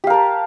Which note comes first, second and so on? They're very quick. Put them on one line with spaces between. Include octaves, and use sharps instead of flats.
G4 F5 A#4 A5